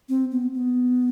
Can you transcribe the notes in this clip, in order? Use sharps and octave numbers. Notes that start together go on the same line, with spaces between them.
C4
B3
B3